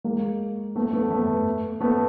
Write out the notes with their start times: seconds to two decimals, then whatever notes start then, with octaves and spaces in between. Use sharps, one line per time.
0.04 G#3 A#3
0.75 A3 B3
0.93 A3 B3
1.11 A3 B3
1.80 A3 B3